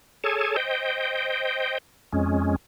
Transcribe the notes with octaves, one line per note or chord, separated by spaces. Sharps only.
G#4 A4 C#5 G#5 A5
C5 D#5 G5
F2 G#3 C#4